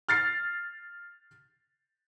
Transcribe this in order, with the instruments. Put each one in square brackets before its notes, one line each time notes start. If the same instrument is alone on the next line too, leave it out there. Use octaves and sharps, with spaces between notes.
[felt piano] F6 A6 C7